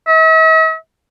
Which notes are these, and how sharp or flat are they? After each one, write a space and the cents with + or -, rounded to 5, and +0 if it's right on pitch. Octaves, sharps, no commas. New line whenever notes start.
E5 -45